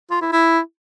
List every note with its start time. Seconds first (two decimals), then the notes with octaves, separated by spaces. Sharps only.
0.11 F4
0.22 E4
0.33 E4